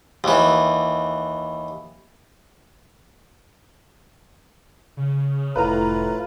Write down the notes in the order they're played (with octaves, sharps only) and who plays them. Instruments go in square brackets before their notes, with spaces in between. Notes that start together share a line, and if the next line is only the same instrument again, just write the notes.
[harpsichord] D#2 E3
[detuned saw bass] C#3
[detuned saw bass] F1 [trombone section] A2 [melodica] F4 [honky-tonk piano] B4 A#5